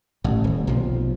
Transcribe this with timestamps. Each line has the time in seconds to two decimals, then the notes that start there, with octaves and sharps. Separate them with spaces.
0.24 A1 A2
0.44 D#1
0.67 B1 C3 F3